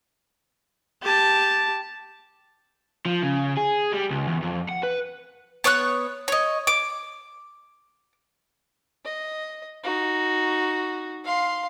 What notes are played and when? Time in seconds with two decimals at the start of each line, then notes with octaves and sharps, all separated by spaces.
1.02 G4 A5
3.06 F3
3.22 C#3
3.57 G#4
3.92 G3
4.11 C#2
4.27 E2
4.42 F2
4.69 F#5
4.83 B4
5.64 B3 C#5 C#6 F#6
6.28 C#5 D#5
6.67 D6
9.05 D#5
9.84 D#4 F#4
11.24 F5 C6